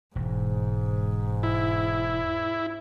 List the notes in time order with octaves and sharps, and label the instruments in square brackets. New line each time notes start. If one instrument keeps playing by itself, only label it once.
[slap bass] E1 [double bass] G#2
[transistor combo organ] E4